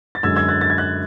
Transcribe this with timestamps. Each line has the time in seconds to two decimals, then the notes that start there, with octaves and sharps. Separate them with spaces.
0.15 A6
0.23 F#2 D3 G#3 E6 G#6
0.36 E6 G#6
0.48 F#6 A6
0.61 A6
0.70 G#6
0.78 F#6 A6